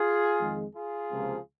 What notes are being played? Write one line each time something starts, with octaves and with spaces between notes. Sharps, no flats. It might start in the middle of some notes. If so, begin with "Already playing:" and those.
Already playing: F4 G#4
F2 D#3 G#3
F4 G#4
C#2 C3 F3 A#3